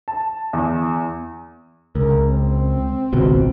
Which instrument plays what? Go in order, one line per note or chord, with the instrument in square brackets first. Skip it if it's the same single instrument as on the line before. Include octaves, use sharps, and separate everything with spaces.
[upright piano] A5
E2
[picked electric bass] C#2 [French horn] A#4
[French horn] C4
[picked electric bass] G#1 C#2 B2